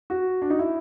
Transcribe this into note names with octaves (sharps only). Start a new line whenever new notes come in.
F#4
D4
D#4
E4